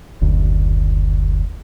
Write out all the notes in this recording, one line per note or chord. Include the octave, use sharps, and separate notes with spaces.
F#1 D2